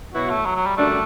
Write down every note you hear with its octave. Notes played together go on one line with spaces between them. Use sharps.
B2 F#3 B3 E4 F#4
A3
F#3
F#3
G3
F#2 D3 G3 A3 D4